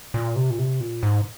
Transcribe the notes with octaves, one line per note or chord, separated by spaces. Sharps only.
A#2
C3
A#2
C3
A#2
G#2